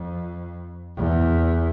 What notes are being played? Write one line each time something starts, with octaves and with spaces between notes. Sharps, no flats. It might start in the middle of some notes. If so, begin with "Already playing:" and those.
Already playing: F2
E2